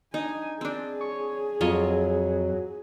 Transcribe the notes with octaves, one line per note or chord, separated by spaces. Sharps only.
D4 D#4 G#5
C4 D4 G#4
C#5
F2 F#3 F4 C#5 D#5